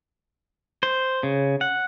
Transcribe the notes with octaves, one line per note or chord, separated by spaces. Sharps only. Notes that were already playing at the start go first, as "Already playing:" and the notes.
C5
C#3
F#5